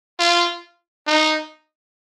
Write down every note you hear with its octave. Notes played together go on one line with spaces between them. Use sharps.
F4
D#4